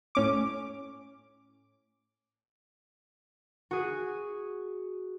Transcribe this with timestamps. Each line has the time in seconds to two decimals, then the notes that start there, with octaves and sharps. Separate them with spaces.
0.15 A2 C#4 D6
3.71 F#4 G#4